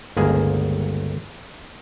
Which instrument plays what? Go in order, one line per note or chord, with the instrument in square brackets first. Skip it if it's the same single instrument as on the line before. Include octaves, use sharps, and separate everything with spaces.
[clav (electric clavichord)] G1 C#2 A#3 G#4 G#5